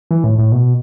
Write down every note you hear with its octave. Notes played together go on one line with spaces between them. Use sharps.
E3
A2
A2
B2